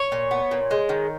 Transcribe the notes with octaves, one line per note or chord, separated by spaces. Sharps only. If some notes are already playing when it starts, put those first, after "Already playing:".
Already playing: C#5
A#2
B3
A#2
G#3
D#3